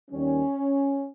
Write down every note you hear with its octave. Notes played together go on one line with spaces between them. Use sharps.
D#2 D#3 G3 C#4